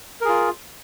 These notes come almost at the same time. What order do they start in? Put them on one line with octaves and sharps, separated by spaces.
A#4 G#4 F4